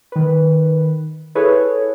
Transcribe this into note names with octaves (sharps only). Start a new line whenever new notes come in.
D#3 B4
E4 G#4 A4 B4 C#5